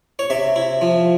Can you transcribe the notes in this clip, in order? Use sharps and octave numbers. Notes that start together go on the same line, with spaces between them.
C#5
C3 E5
E4
F3